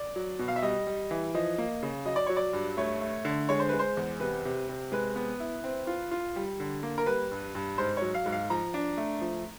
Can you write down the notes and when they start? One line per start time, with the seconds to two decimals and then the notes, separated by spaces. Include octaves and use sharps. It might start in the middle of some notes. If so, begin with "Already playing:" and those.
Already playing: D5
0.16 F#3
0.39 B2
0.48 F5
0.56 E5
0.62 G3 D#5
0.87 G3
1.11 E3
1.34 F3 D#5
1.58 A#3
1.83 C#3
2.05 F#3 D#5
2.16 D5
2.26 F#3 C#5
2.37 D5
2.53 G2
2.77 A3 C#5
3.01 A3
3.25 D3
3.49 G#3 C#5
3.60 C5
3.69 G#3 B4
3.79 C5
3.97 E2
4.20 C3 B4
4.45 C3
4.69 C3
4.92 G#3 B4
5.16 B3
5.40 E4
5.64 C4
5.87 F4
6.11 F4
6.36 G3
6.60 D3
6.83 A#3
6.98 A#4
7.06 G3 B4
7.31 G2
7.55 G2
7.78 G#2 C5
7.97 F#3 C#5
8.14 F5
8.26 G#2
8.32 F5
8.50 F3 A#5
8.74 D4
8.97 A3
9.21 F3